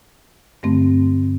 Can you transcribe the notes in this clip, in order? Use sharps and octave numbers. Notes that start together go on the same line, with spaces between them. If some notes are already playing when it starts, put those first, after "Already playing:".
G2 D3 A3 C4